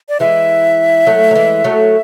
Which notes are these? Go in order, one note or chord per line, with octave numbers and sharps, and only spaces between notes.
D5
E3 G#3 E5
F#3 A3
F#3
E3 G#3
F#3 A3